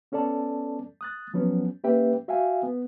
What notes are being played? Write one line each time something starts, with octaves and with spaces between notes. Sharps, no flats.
B3 C#4 A4 D5 A5
D#6 F#6 A6
F3 F#3 B3 C#4
A#3 C#4 G4 B4 E5 G5
F#4 E5 F5 G5 G#5
B3